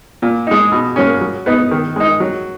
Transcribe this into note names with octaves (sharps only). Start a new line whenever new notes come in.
A#2
G#3 D#4
B2
F#3 A#3 C#4
F#3
B3 D#4
D#3
G#3 D#4
F#3